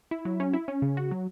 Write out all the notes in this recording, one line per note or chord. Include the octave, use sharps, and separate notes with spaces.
E4
F#3
C#4
E4
C#4
C#3
F#4
F#3